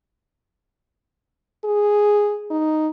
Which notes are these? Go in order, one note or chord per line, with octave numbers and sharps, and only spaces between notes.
G#4
D#4